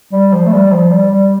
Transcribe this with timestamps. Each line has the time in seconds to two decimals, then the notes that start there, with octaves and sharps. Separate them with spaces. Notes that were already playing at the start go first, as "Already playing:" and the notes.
0.12 G3
0.33 F3
0.46 A3
0.53 G3
0.72 F3
0.91 G3
1.11 G3